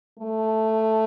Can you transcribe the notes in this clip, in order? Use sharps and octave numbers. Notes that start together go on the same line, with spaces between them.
A3